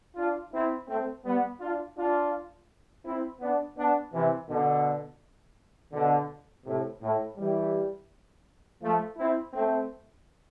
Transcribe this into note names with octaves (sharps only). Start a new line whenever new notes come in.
D4 F4
C4 E4
A3 C4
G3 B3
D4 F4
D4 F4
C4 E4
B3 D4
B3 D4
C3 E3
B2 D3
B2 D3
A2 C3
A2
E3 G3
F3 A3
C4 E4
A3 C4